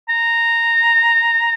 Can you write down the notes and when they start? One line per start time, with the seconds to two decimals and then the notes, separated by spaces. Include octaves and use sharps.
0.09 A#5